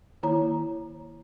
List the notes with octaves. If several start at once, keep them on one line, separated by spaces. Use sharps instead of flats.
D#3 A#3 E4 C#5 A#5